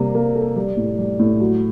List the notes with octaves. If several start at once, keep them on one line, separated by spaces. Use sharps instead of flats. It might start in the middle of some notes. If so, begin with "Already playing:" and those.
Already playing: C3 G3 A#3
A#3
A4
G3
A2
G3
A2
F#3